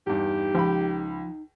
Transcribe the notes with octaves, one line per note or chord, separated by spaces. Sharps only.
E2 G2 D#4 G4
C#2 F3 B5